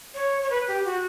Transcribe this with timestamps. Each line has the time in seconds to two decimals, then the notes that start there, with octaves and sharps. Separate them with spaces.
0.15 C#5
0.42 C#5
0.50 B4
0.68 G4
0.85 F#4